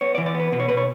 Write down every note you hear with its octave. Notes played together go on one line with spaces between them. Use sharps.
B3 C#5
D5
E3
D5
B3
B4
B2 B4
C#5
B2 B4
C#5